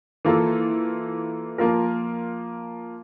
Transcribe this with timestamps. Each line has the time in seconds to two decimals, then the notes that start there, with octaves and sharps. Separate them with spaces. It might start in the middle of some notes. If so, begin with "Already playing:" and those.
0.25 E3 A#3 F4 A4
1.58 F3 A#3 F4 A#4